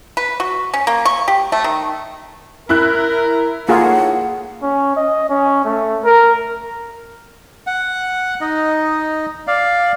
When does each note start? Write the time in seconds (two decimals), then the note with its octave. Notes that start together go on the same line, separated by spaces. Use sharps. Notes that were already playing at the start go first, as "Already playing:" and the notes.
0.17 B4
0.40 F#4
0.74 C#4
0.87 A#3
1.05 C#6
1.28 G4
1.52 A3
1.64 D#3
2.69 E4 A#4 F#6
3.69 A#3 D#4 F4 G#4 A4 C#5 F#5
4.62 C#4
4.96 D#5
5.29 C#4
5.65 A3
6.05 A#4
7.67 F#5
8.41 D#4 D#5
9.47 D5 F5